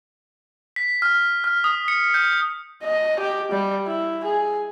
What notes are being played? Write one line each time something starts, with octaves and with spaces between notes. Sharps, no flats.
B6
F6
F6
D#6
C#7
G6
D#5
G4
G3
E4
G#4